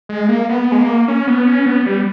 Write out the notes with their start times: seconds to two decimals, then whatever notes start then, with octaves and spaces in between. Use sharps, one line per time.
0.09 G#3
0.29 A#3
0.49 B3
0.72 G#3
0.79 A#3
1.08 C#4
1.27 B3
1.47 C#4
1.66 B3
1.86 G3